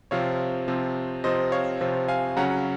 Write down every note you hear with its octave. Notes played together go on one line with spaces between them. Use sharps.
C3 F3 C4 C#5 F5
C3 F3 C4
C3 F3 C4 C5 D#5
C#5 F5
C3 F3 C4
F5 G#5
C#3 F#3 C#4 F#5 A#5